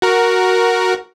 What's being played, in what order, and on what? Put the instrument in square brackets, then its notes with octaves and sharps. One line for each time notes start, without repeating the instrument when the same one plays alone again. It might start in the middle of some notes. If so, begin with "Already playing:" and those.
[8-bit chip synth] F#4 A#4